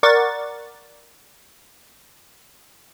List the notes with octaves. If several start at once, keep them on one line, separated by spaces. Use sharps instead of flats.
A#4 D5 F#5 C#6 A6